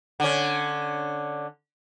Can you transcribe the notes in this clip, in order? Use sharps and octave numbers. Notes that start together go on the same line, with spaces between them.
D3 C#4